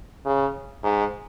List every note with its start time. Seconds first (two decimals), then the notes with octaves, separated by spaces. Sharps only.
0.25 C#3
0.84 G#2